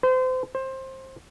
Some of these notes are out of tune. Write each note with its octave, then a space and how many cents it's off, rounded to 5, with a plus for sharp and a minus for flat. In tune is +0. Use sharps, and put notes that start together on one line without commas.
C5 -30
C5 +20